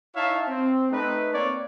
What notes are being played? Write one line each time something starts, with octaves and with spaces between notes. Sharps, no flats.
D#4 E4 C#5 E5 F5 A5
C4
A3 D#4 B4
A#3 C4 C#5 D5